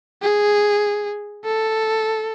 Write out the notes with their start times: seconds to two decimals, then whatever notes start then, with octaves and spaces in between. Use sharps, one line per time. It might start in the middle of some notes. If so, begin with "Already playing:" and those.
0.22 G#4
1.45 A4